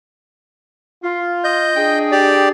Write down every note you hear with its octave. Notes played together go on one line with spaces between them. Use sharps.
F4
D#5 G6
D4 G#4 G5
G4 D5